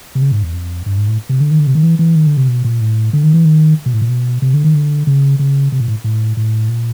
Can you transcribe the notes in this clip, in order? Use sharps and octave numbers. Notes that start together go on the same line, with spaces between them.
C3
C#3
G#2
E2
F2
G2
G#2
A2
C3
D3
D#3
D3
C3
D#3
E3
E3
D#3
D3
C3
B2
A#2
A2
D3
D#3
E3
D#3
B2
A2
A#2
B2
C3
D3
D#3
D3
C#3
C#3
C3
A#2
A2
A2
A2
A#2